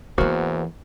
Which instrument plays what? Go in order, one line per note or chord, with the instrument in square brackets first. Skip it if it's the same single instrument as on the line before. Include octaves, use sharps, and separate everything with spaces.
[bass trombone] E2 [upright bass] E3 B3 [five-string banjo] A#3 F#4 C5